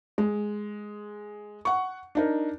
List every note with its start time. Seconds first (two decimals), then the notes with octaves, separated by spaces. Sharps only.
0.18 G#3
1.65 F#5 C#6
2.15 D4 D#4 A#4